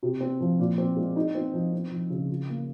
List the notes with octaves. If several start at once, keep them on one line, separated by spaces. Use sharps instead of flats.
C3
C4
F3
A#2
C4
G#3
D#4
C4
F3
C4
F3
C#3
F4
A#3